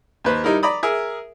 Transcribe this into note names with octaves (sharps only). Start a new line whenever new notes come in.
D#2 B4 C5
G3 D#4 E4 A#4
D5 A#5 B5 D#6
G#4 A#4 E5